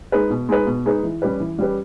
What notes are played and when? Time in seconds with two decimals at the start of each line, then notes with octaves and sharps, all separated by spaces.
0.12 G#3 D#4 G#4 B4
0.30 B2
0.49 G#3 D#4 G#4 B4
0.66 B2
0.85 G#3 D#4 G#4 B4
1.03 E3
1.22 G3 C#4 G4 B4
1.40 E3
1.59 G3 C#4 G4 B4